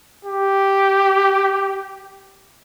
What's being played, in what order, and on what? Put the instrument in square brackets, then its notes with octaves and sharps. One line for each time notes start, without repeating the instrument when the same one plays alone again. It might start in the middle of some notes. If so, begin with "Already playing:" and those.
[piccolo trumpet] G4